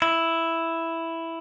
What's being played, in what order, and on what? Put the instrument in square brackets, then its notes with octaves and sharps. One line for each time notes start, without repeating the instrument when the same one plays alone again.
[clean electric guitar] E4